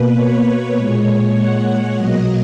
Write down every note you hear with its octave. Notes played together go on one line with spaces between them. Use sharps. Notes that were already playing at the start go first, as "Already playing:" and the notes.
Already playing: B2 A#3 B4
C#5
A#2 G#3
F#5
B2 F#3 A#3 D#5